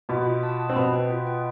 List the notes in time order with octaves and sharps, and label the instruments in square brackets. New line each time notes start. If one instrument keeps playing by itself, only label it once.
[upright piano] B2 B3 [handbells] F4
[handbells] F4
A5
A5
[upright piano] C4
[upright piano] B2 B3 [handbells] B4
[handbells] G5
F4
G5